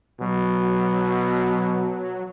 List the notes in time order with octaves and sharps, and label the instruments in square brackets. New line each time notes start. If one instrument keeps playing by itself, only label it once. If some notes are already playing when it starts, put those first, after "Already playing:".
[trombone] B2 [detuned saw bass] F#3